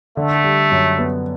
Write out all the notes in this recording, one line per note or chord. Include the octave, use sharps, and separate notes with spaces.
D3 A3
G3
F#2
B3